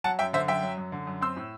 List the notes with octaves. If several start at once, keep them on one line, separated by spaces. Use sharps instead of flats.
F#3 F#5 A5
F#2 E5 G5
D3 C5 E5
F#2 E5 G5
F#3
F#2
D3
F#2
C4 C6 E6
A2